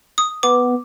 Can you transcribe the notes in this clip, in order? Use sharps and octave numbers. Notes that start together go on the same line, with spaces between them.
D#6
B3 D6